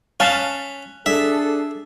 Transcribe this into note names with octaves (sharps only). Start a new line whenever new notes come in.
C#4 F5 A5 F#6 B6
D4 G#4 A4 E5